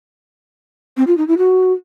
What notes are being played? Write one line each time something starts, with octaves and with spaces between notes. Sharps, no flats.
C4
F4
D#4
E4
F#4